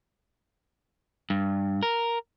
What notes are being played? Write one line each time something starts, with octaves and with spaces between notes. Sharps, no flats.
G2
A#4